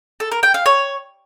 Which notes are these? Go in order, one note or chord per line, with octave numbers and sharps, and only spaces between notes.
A4
A#4
G5
F5
C#5